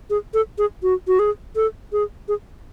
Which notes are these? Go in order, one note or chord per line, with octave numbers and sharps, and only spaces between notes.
G#4
A4
G#4
F#4
F#4
G#4
A4
G#4
G#4